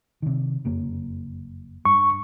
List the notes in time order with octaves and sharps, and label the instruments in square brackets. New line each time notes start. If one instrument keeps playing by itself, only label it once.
[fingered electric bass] C3 D#3
F#1 F2 A#3
[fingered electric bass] G2 [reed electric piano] C#6